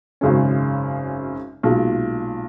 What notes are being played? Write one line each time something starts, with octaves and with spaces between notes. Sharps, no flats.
G#1 F#2 C#3 G#3 C#4
B1 A#2 G#3